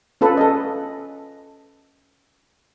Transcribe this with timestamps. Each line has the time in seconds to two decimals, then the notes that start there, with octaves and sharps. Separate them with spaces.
0.21 C#4 F4 A4 B4
0.37 A4 D#5